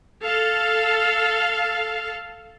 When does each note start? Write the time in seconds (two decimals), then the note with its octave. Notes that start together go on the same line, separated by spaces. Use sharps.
0.24 A4 F5